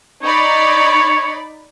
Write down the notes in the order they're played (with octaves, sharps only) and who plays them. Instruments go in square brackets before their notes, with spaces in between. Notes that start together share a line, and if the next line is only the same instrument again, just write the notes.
[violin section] D#4 D5 B5 [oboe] C#5